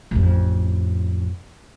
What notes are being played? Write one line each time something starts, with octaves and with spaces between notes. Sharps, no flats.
A1 F2